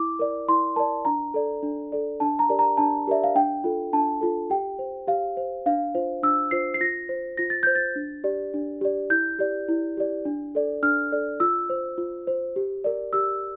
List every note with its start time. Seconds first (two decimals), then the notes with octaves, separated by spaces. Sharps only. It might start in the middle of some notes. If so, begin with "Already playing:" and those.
Already playing: E4 D6
0.19 A#4 D5
0.48 E4 C6
0.76 A#4 D5 A5
1.05 D4 A#5
1.34 A4 D5
1.63 D4
1.92 A4 D5
2.20 D4 A5
2.39 A#5
2.49 G4 A#4 D5
2.59 A#5
2.77 D4 A5
3.07 G4 A#4 D5 E5
3.24 F5
3.35 D4 G5
3.64 F4 A4
3.93 D4 A5
4.21 F4 A4
4.50 G4 G5
4.79 C5
5.07 G4 F5
5.37 C5
5.66 D4 F5
5.95 F4 C5
6.23 D4 E6
6.51 F4 C5 C7
6.74 C7
6.80 F4 A#6
7.09 C5
7.37 F4 A#6
7.50 A6
7.63 C5 G6
7.75 A6
7.96 D4
8.24 G4 D5
8.54 D4
8.81 G4 D5
9.10 E4 G6
9.39 G4 D5
9.68 E4
9.97 G4 D5
10.25 D4
10.55 A4 D5
10.83 D4 F6
11.12 A4 D5
11.40 F4 E6
11.70 C5
11.98 F4
12.27 C5
12.56 G4
12.84 A#4 D5
13.13 G4 E6